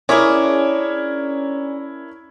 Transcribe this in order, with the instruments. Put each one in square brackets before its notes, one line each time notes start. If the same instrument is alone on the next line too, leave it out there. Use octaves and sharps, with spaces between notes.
[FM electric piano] C#4 [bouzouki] D4 G#4 [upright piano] E4 A#4 C#5